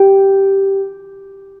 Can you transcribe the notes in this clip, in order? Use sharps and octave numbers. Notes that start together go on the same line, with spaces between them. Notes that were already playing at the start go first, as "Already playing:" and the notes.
Already playing: G4